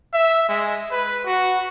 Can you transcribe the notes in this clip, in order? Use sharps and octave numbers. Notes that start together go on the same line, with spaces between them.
E5
G#3
B4
F#4